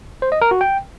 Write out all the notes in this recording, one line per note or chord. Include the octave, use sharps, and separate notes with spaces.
C5
D#5
A#4
F#4
G5